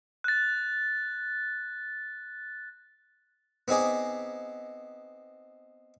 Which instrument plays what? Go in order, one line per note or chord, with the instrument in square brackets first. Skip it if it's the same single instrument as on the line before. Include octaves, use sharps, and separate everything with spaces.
[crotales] F#6 A6
[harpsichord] B3 C4 D#4 G#4 D5